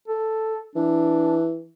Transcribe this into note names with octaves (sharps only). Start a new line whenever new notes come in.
A4
E3 D4